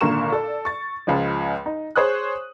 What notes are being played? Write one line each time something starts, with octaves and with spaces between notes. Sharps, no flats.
G#1 A#2 D3 A#4 C#6 E7
A4 D5
C#6 A6
C#2 C#3 F3 G#3
D#4
G#4 C5 C#5 D#6 F#6